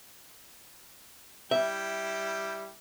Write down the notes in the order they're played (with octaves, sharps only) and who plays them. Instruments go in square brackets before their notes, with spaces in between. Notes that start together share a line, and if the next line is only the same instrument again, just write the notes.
[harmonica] G3 E4 G5 [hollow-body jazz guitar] E5